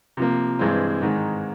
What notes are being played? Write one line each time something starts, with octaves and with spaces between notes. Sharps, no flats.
C3 F3 A#3
G2 E3 G#3 C4
G#2 D#3 G#3